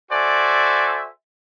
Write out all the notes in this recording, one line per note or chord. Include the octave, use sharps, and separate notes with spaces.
F#4 A4 C5 D5 E5 G#5